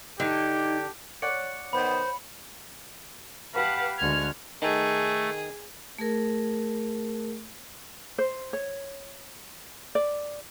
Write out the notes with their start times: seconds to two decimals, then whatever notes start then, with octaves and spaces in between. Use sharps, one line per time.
0.20 D3 D#4 G4
1.22 C#5 D5 F#5 C#7
1.73 D#3 B3 C5 B5
3.52 G4 B4 F5 F#5 A5
3.98 D2 G#3 F#5 F6 G#6
4.62 D#3 A3 G#4
5.98 A3 G#4 A#4
8.18 C5
8.53 C#5
9.95 D5